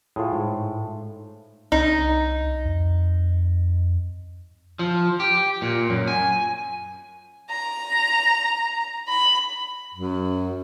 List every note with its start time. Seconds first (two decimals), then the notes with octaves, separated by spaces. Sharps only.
0.16 A2 F4 G#4
0.33 G#2
1.72 C2 D#4
2.65 F2
4.79 F3
5.20 G4
5.62 A#2
5.90 F#2
6.08 G#5
7.50 A#5
9.08 B5
9.93 F#2